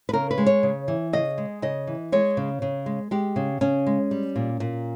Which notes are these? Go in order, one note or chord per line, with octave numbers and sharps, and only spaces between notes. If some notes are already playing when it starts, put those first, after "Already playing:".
B4
C#3 A#4
B4
G#3
C#5
C#3
E3
C#3 D#5
G#3
C#3 D#5
E3
G#3 C#5
C#3
C#3
G#3
G#3 G4
C#3
C#3 C#4
G#3
G3
A#2
A#2